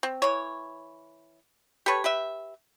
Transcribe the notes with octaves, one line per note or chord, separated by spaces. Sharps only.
C4
E3 C#5
G4 A4 B4 C#5
G4 B4 E5